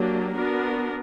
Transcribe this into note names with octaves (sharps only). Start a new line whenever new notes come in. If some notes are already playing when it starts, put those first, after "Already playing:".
Already playing: F#3 A#3 D4 G4
B3 D4 F#4 A#4